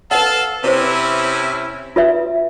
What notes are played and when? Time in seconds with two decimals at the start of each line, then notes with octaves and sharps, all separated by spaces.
0.11 A4 B4 F5 F#5 A5
0.64 C3 C#4 E4 B4 C5
1.96 F4 B4 E5